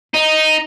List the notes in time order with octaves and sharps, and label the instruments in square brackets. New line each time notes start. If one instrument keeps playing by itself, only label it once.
[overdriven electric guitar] D#4